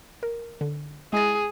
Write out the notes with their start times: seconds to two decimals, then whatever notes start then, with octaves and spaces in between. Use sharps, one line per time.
0.23 A#4
0.61 D3
1.13 G#3 E4 G#4 A6